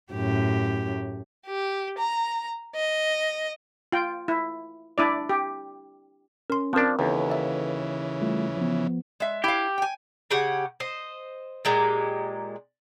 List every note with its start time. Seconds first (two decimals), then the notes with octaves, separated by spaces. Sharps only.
0.13 F#2 A2 G4
1.46 G4
1.99 A#5
2.76 D#5
3.92 F4 G5
4.28 E4
4.98 D4 E4 D5
5.29 G4
6.50 C#4 A#4 C6
6.73 F3 C4 D4 A#4
6.99 D#2 C#3 E3 A4 B4
7.30 D5 E5
8.21 G3 A3 F4
8.57 F3 B3
9.20 G#3 E5
9.44 E4 G4 F5
9.78 G5 G#5
10.31 C#3 G4 F#5 G#5
10.80 C5 D#5
11.65 A#2 G#3 G4 A#5